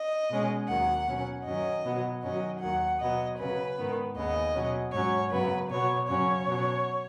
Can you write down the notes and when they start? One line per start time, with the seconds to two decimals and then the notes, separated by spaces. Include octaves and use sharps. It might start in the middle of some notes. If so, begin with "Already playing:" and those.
Already playing: D#5
0.31 B2 G#3 C#4
0.69 D#2 D#3 F#3 F#5
1.08 B2 F#3 C#4
1.46 F#2 D#3 F#3 C#4 D#5
1.85 B2 F#3 B3
2.23 F#2 D#3 F#3 C#4 D#5
2.62 D#2 D#3 F#3 F#5
3.01 B2 F#3 B3 D#5
3.39 C#3 F#3 C#4 B4
3.78 G#2 D#3 B3
4.16 D#2 C#3 B3 D#5
4.55 B2 F#3 C#4
4.93 G#2 F#3 C#4 C#5
5.32 F#2 C#3 F#3 B3 B4
5.71 B2 F#3 B3 C#5
6.09 F#2 C#3 F#3 C#4 C#5
6.48 B2 F#3 C#4